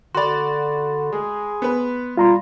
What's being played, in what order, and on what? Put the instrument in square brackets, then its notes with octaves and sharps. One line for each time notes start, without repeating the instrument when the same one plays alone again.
[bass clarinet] D3 [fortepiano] F#4 D5 [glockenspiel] B5 C6
[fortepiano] G#3 [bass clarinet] G#4
[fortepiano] B3 B4
[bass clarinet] G3 [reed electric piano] F4 A#5 C6